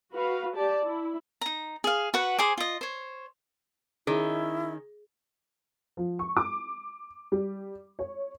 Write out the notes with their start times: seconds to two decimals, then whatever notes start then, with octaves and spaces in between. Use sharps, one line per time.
0.11 F#4 B4 F5
0.55 G4 D5 A5
0.85 E4
1.41 D#4 A#5
1.84 G#4 F5
2.14 F#4 B4 F#5
2.38 G#4 C5 G#5 D6
2.58 F4 D#5
2.81 C5 C#5
4.07 D#3 C#4 E4 G#4
5.97 F3
6.19 C#6
6.37 D6
7.32 G3
7.99 C#5